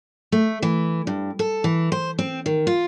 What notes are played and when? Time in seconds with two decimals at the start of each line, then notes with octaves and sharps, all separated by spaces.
0.32 A3
0.62 E3
1.07 G2
1.39 A4
1.64 E3
1.92 C5
2.19 C4
2.46 D#3
2.67 F4